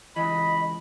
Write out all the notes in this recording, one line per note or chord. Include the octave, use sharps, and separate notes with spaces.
C#2 E3 D#5 B5